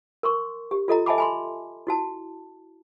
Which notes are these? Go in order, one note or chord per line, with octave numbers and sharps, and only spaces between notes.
A#4 C6 C#6
G4
F4 A4 D#5 A#5
D#5 E5 G#5 A5 B5 D6
G#5 B5 C6
E4 F#4 A5